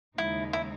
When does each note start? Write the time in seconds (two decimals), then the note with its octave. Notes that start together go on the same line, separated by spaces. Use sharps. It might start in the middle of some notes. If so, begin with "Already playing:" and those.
0.18 D#2 C#3 G#3 D#4 E4
0.53 E4